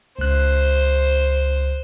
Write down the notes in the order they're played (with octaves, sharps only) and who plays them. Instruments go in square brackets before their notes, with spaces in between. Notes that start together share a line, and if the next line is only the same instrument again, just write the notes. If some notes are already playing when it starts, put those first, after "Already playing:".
[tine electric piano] C#2 F#6 [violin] C5